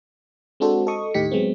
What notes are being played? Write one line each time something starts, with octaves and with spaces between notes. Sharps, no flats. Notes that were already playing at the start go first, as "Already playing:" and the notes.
G#3 C4 D4 F#4 A4 C5
A4 D#5 C#6 D#6
D#2 A2 D#4 G4 B6 C#7
F#3 G#3 B3 C4